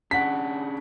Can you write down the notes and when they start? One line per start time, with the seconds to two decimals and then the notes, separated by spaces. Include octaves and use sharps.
0.11 C#4 D4 G#4 F#5 B6